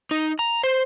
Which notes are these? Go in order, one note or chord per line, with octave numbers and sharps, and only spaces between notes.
D#4
A#5
C5